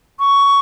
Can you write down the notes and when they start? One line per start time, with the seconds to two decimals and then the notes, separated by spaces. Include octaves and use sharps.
0.20 C#6